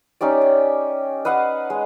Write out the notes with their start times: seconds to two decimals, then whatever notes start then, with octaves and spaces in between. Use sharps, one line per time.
0.21 C#4 D#4 G4 D5
0.42 G5
1.25 B4 D#5 F5 F#5
1.70 G#3